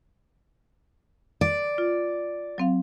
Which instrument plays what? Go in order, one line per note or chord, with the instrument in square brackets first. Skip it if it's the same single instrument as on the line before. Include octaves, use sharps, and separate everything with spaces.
[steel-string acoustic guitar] D5
[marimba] F4
F#3 C4 F5